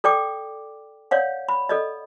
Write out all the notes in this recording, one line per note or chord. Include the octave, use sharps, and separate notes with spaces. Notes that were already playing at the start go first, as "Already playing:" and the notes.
A4 D5 G5 D6
C#5 D5 F5 F#5
B5
A4 D5 D#5